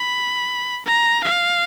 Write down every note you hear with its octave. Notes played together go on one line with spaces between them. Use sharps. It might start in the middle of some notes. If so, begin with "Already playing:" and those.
Already playing: B5
A#5
F5